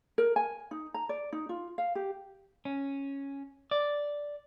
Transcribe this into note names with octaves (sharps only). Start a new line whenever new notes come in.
A#4
G#5
D#4
A#5
D5
D#4
F4
F5
G4
C#4
D5